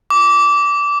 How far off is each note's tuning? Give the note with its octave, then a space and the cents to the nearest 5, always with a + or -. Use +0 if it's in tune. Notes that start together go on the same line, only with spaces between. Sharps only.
D6 -20